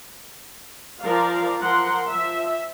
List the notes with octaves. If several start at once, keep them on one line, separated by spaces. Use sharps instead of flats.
F3 A#4 D5 F5
F3 A#4 F#5 C6
F3 E5